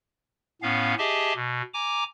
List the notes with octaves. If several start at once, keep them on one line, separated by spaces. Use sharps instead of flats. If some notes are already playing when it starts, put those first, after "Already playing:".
A2 B3 C#4 F5
G4 G#4 D#5 E5 G#5 A5
B2
G#5 A#5 D6